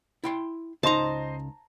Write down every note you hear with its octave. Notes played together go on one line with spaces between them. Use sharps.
E4 G5 C6
C#2 D#4 C5 D#5 A5 A#5 C6